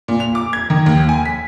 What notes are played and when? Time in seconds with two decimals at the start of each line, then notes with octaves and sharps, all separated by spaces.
0.08 A#2
0.20 F7
0.35 D6
0.53 G#6
0.70 D#3
0.86 D#2
1.09 G#5
1.25 B6